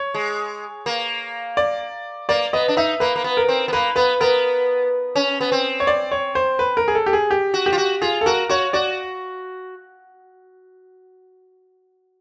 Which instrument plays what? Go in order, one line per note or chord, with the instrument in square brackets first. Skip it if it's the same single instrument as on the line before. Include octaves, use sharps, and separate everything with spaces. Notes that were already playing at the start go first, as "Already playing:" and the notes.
Already playing: [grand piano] C#5
[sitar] G#3
A#3
[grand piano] D5
[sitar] A#3 [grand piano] D5
[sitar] B3 [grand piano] D#5
[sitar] D4
[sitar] D#4 [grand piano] E5
[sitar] A#3 [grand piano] B4
[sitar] A#3
B3
[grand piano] A#4
[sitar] C4
B3
[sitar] A#3 [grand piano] B4
[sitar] B3 [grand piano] B4
[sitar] B3 [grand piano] A#4
[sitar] C#4
B3
C4
[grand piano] C#5
D5
C#5
C5
B4
A#4
G#4
A4
G4
G#4
G4
[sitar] F#4
[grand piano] G4
[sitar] F4
F#4
[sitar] F4 [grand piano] G#4
[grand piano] A4
[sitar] F#4 [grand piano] A#4
[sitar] F#4 [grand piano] C#5
[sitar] F#4 [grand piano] D5